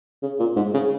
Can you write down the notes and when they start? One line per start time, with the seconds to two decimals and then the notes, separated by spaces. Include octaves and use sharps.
0.23 C#3
0.40 A#2
0.57 G#2
0.74 C#3